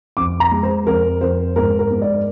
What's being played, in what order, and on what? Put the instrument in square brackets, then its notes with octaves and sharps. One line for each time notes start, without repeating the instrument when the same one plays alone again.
[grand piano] F2 D6
A#5
G#3
C5
F2 A#4
F2 C5
G#2 A#4
A#4
G#2
D5